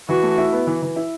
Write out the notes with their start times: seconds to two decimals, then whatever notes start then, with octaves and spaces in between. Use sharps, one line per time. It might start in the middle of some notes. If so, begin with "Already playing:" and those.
0.08 E3 F#4
0.23 A3
0.38 E4
0.53 B3
0.67 E3
0.83 E3
0.96 E4